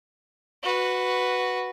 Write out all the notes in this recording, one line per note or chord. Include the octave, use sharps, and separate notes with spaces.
F#4 B4